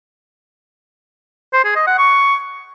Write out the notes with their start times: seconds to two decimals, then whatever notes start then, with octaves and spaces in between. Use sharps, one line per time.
1.53 C5
1.64 G#4
1.76 D#5
1.87 F#5
1.98 C#6